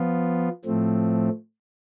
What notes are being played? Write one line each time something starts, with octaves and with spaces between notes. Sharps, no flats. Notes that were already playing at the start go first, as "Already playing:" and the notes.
Already playing: F3 B3 F4
A2 F3 A3 C4